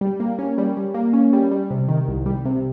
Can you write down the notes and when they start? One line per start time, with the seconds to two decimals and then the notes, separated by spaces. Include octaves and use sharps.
0.01 G3
0.20 A#3
0.39 C#4
0.58 G3
0.77 G3
0.94 A#3
1.13 C#4
1.33 G3
1.51 G3
1.70 C3
1.89 D#3
2.08 C2
2.26 G3
2.45 C3